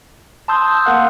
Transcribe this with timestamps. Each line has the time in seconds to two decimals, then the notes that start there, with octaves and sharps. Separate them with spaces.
0.48 A5 C6 D#6 E6 G6
0.85 A#3 A#4 F5 F#5 F#6